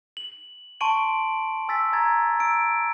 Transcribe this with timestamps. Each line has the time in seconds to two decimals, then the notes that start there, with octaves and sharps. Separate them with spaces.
0.17 F#7
0.81 A5 C6 C#6 D7 D#7 F#7
1.68 G#5 E6 A6 B6
1.93 A#5 G#6 A6
2.39 A#5 E6 D7